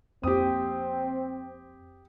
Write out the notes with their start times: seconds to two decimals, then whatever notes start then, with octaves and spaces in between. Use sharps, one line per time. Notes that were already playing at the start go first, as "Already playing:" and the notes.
0.23 F2 A#3 C4 G4 D#6